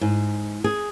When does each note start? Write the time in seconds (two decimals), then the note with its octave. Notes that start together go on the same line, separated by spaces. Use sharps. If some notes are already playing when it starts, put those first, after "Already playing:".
0.01 G#2
0.64 G#4